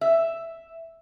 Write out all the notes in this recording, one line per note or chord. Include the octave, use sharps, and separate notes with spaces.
E5